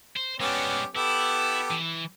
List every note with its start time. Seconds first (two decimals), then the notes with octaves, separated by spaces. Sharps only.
0.16 C5
0.40 G#3 B3 C#4 D4 G4
0.96 B3 E4 G4 A4
1.71 E3